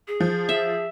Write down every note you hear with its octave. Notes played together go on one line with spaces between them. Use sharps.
G#4
F3
E5